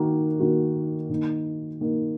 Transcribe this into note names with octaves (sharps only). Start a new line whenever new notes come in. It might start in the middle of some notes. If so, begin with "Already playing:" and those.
Already playing: D#3 A#3 F#4 A#4
D#3 A#3 F#4 A#4
D#3 A#3 D#4
D#3 A#3 D#4